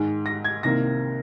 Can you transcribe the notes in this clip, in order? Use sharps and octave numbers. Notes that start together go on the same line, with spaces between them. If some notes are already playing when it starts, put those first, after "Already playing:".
Already playing: G#2 D#3 G#3
A#6
G#6
C2 C3 D#3 A#3 A#6